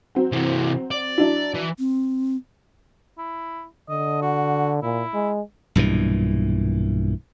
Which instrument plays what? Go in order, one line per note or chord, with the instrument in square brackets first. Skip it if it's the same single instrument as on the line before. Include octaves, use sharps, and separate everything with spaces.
[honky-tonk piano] F#3 C4 F#4
[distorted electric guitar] C3 E3
D5
[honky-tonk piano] F#3 D4 E4
[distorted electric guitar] E3
[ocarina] C4
[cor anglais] E4
[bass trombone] D3 [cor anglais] D#5
[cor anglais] F#4
[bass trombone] A#2 [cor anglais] E4
[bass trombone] G#3
[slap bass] B1 G2 A#2 E3